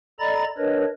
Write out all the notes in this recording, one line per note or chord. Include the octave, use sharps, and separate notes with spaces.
A4 D5 D#5 A#5 B5 A6
D4 A#4 B4 C#5 D#5